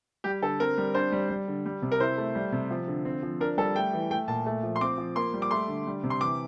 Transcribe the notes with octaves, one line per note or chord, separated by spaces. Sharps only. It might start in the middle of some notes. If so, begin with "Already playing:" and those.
G3 G4
D3 A4
C4 A#4
G3
D4 C5
G3
G3
D3
G3
C3
A#4
E4 C5
A3
G3
C3
F3
D3
C4
F3
D4 A#4
G3 A4
A3 G5
E3
A3 G5
A#2 A5
A3
F3
C6
C4 D6
F3
A#3 C6
G3
D6
A3 C6
D3
G3
C3
C6
E3 D6